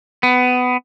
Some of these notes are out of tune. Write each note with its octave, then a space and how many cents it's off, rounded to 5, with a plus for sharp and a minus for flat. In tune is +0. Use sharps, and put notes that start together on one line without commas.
B3 +20